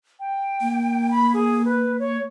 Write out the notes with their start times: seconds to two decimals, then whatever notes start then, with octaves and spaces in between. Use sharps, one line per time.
0.20 G5
0.61 A#3
1.11 B5
1.34 G#4
1.65 B4
1.99 C#5